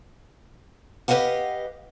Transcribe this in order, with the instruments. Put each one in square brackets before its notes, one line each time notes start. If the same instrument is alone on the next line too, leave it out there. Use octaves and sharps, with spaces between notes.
[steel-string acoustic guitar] G4 B4 C5 D#5 F5 F#5